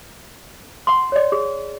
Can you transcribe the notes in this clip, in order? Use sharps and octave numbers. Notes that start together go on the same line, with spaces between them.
F#5 C6
C#5 D5
G#4